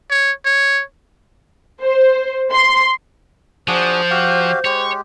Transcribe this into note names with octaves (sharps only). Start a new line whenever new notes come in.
C#5
C#5
C5
C6
F3 D4 F#4 G#4 C5
F#4 G4 F5
G#3 G4 C#5